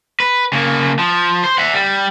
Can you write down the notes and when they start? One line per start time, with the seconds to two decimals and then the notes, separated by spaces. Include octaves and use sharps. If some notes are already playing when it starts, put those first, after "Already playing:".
0.20 B4
0.53 C#3 A#3
0.99 F3
1.44 C5
1.58 E5 F#5
1.73 G3